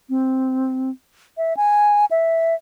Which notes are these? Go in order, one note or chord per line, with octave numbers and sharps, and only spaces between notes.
C4
E5
G#5
E5